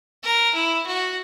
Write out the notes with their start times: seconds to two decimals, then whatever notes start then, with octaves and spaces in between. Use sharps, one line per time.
0.24 A#4
0.55 E4
0.87 F#4